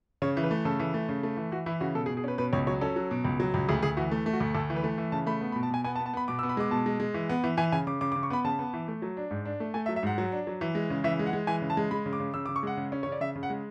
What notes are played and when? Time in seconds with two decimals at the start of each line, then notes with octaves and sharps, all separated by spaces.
0.22 C#3 C#5
0.37 E3
0.44 B4
0.51 A3
0.65 C#3 A4
0.80 E3
0.94 A3
1.09 C#3
1.23 A3
1.37 E3
1.52 E3 F#4
1.66 E3 E4
1.81 C#3 F#4
1.95 B2 A4
2.06 G#4
2.09 B2
2.17 G#4
2.24 C#4 B4
2.38 B2 B4
2.53 C#2 C#5
2.67 F#3 C#5
2.81 C#4 A4
2.96 F#3
3.11 B2
3.25 C#2
3.40 F#3
3.54 C#2
3.69 D2 G#4
3.83 D2 G#4
3.97 E3 F#4
4.11 A3
4.26 A3
4.33 F#4
4.40 D2
4.54 D2 A4
4.70 E3
4.76 B4
4.84 A3
4.98 E3
5.12 C#3 A5
5.26 A3 B5
5.41 B3
5.52 B5
5.56 B2
5.63 A5
5.70 B2 G#5
5.84 B3 G#5
5.95 A5
5.99 B3
6.06 A5
6.13 B3 B5
6.28 B2 D6
6.39 E6
6.43 B3
6.49 B5
6.57 G#3 D6
6.71 B2 A5
6.86 G#3
7.00 G#3
7.14 E3
7.29 B3
7.44 E3
7.57 E3 G#5
7.72 C#3 G#5
7.87 C#3 D6
8.01 C#3 D6
8.12 D6
8.16 C#3
8.23 C#6
8.30 B3 B5
8.44 C#3 A5
8.59 B3
8.74 E3
8.88 A3
9.02 F#3
9.17 D4
9.31 G#2
9.45 D4
9.60 A3
9.74 A3 G#5
9.86 E5
9.89 F#3
9.96 E5
10.03 G#2 F#5
10.18 F#3
10.32 D4
10.47 F#3
10.61 E3
10.75 G#3
10.90 C#3
11.04 E3 E5
11.19 G#3
11.26 F#5
11.33 G#3
11.47 E3 G#5
11.62 C#3
11.70 A5
11.77 G#3
11.91 G#3 B5
12.06 C#3
12.13 D6
12.20 C#3
12.34 C#3 E6
12.46 D6
12.49 C#3
12.56 C#6
12.63 G#3 F#5
12.77 C#3
12.92 C#4
13.03 C#3 C#5
13.12 D5
13.21 C#3 E5
13.36 C#3
13.43 F#5
13.50 G#3